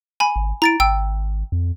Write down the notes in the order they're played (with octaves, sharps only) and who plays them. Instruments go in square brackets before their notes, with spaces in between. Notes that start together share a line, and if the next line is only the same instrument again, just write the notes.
[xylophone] G#5 B5
[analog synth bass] G#1
[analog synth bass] E4 [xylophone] A#5 A6 D7
[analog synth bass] G#1 [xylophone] G5 E6
[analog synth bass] F2